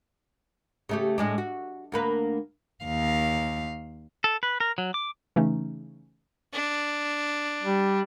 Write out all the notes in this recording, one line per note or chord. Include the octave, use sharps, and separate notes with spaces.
C#3 A3 G4
A2 G#3 D4
F#4
D2 A#3 B4
D#2 F5
A4
B4
A#4
F#3
D6
C#3 E3 A3 C#4 D#4
D4
G3